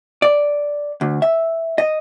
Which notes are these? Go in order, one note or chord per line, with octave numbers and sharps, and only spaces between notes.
D5
D2
E5
D#5